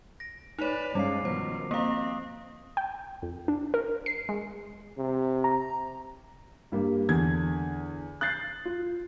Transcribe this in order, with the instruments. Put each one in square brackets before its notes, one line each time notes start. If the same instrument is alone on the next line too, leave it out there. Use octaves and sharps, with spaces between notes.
[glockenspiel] A#6 D7
[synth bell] D#4 C#5 [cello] B4 D5 [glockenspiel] F7
[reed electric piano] G2 C#4 F5 [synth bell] G3 [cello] G#3 [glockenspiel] D6 C7
[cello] B2 D#3 [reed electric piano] F3 [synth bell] C5
[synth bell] A#3 F5 [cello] C4 [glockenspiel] A#5 D#6
[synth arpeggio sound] G5
F2
D4
A#4
C7
G#3
[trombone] C3
[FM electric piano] A#5
[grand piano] G2 G3 A#3
E2 D3 G#6
F#6 G6 A6 C7
F4